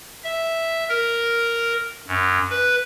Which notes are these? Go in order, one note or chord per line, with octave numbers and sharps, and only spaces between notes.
E5
A#4
F#2
B4